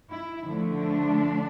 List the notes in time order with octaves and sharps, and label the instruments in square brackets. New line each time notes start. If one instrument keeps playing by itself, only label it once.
[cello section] E4
D3 F3 A3
D4